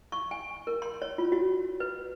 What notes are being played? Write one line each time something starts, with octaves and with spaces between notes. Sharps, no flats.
C#6
G#5
A#4
C6
C#5
F4
F#4
B4